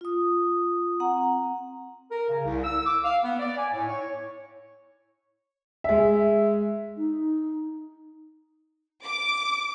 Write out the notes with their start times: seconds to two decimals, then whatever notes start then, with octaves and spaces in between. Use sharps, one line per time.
0.01 F4 D#6
1.00 C4 F#5 A#5
2.11 A#4
2.29 C#3
2.45 C2
2.64 E6
2.86 D6
3.03 F5
3.24 B3
3.39 D5
3.57 G#5
3.73 A2
3.88 C#5
5.84 G#3 E5
6.97 D#4
9.05 D6